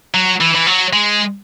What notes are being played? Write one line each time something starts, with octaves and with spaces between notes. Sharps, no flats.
F#3
E3
E3
F#3
G#3